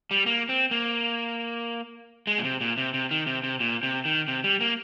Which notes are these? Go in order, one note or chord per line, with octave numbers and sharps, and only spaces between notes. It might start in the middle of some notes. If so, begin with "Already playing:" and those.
G3
A#3
C4
A#3
G#3
A#2
C3
A#2
C3
C3
D#3
C3
C3
A#2
C3
D#3
C3
G3
A#3